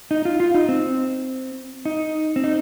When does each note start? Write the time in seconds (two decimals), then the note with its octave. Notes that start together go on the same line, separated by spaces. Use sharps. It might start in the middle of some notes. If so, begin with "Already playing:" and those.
0.11 D#4
0.25 F4
0.40 F4
0.54 D#4
0.69 C4
1.85 D#4
2.36 C4
2.44 D#4